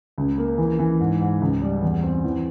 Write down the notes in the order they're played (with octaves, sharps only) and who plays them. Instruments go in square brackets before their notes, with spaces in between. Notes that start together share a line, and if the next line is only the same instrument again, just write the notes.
[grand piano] C#2
A#3
E3
E3
G#2
G#2
C#2
G3
E2
C4
E3